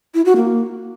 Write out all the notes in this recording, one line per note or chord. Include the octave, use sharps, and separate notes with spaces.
E4
F#4
A#3